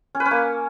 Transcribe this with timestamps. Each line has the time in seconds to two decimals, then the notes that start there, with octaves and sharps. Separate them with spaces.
0.15 C#4
0.20 B4
0.25 C#4
0.31 A#3